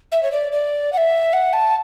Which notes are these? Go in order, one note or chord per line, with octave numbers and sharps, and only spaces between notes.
E5
C#5
D5
D5
F#5
E5
F#5
A5